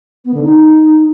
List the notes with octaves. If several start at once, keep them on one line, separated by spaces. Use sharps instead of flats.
B3
D3
D#4